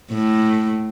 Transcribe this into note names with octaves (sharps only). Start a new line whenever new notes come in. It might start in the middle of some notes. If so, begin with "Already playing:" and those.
A2